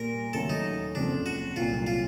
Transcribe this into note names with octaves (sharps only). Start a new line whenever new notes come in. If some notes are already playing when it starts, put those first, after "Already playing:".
Already playing: A#2 G3 A#3 A#4
D#2 C#3 F#3 A3 C#4 A4
D#4
F#1 F2 C#3 F3 D4
F#4
C2 A#2 F#3 F4
F4